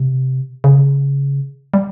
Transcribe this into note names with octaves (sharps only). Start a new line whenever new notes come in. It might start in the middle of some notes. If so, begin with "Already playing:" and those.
Already playing: C3
C#3
G3